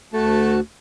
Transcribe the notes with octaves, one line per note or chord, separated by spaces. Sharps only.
D2 A3 F#4 A5